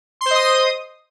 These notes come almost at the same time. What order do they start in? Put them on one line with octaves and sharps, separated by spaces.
C6 C5 D#5 D#6